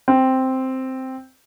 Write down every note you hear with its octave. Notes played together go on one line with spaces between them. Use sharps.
C4